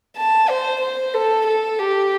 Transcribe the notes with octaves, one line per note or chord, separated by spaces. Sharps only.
A5
C5
C5
A4
A4
G4